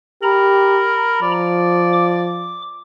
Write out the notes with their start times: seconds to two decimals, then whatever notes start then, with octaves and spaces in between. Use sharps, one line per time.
0.23 G4 A#4 A#5 B5
1.22 F3 D5
1.93 D6